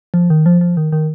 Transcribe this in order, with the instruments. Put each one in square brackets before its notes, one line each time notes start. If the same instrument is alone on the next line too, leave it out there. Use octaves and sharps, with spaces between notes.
[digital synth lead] F3
D#3
F3
F3
D#3
D#3